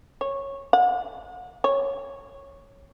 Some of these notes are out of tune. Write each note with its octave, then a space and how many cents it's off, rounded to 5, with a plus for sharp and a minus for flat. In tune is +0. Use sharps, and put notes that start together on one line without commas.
C#5 -10
F#5 -35
C#5 -5